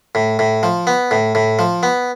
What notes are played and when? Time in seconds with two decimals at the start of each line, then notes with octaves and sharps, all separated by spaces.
0.15 A2
0.39 A2
0.63 F3
0.87 B3
1.11 A2
1.35 A2
1.59 F3
1.83 B3